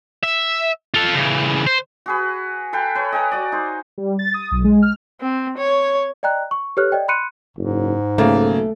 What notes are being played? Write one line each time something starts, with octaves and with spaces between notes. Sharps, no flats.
E5
F4 A4
C#3 E3
C5
F#4 G#4 B4
A4 B4 F5 G5
B4 C#5
D#5 G5 G#5 A#5
F#4 D5
D#4 C5
G3
A6
D#6
B1
G#3
F6
C4
C#5
D5 D#5 G5 A#5 F#6
C#6
G4 A4 B4 C#5 F6 F#6
D5 D#5 G5
B5 C6 F#6 C#7 D#7
F#1 G#2
B1 C#3 A3 A#3